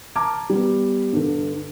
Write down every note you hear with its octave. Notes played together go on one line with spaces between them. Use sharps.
A5 A#5 D6 F6 G#6
G3 B3
G2 D3